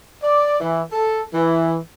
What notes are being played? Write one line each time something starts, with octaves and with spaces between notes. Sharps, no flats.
D5
E3
A4
E3